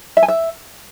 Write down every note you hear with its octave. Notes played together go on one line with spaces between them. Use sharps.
E5
G#5
E5